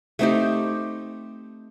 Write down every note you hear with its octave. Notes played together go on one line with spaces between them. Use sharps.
A3 C4 D#4 G4